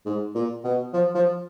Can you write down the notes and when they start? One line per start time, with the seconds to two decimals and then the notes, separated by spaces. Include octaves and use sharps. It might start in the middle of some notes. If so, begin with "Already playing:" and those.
0.06 G#2
0.35 A#2
0.64 B2
0.93 F3
1.15 F3